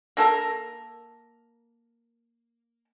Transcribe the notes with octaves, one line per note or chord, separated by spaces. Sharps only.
A#3 A4 A#4